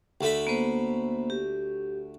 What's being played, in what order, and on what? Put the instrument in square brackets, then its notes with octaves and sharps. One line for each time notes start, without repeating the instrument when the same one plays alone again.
[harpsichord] D2 A3 B5
[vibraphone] A#3 B3 C5
G4